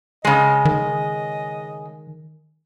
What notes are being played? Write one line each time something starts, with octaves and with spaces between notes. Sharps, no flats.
C#3 G#3 D#5
D#3